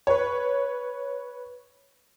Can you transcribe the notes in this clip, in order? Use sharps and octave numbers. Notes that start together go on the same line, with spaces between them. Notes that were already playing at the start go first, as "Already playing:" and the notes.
B4 C#5